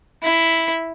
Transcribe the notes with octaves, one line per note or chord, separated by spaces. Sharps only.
E4